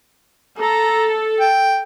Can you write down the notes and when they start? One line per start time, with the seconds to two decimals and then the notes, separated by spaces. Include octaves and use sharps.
0.59 A4 A#5
1.40 G5